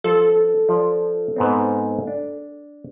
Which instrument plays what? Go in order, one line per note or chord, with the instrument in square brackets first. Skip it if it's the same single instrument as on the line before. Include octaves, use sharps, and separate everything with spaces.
[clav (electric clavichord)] F3 [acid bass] A4
[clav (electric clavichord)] F3 D5
G#2 B3 C4
D4